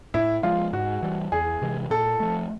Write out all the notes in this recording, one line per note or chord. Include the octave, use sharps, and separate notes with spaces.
A2 E4
F3 G#3 F4
G#2 F#4
E3 G3
E2 G#4
C3 E3 G#3
A#2 A4
F3 A3